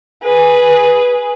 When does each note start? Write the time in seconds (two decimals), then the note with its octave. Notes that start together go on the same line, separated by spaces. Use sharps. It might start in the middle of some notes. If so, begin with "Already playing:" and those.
0.23 G#4 B4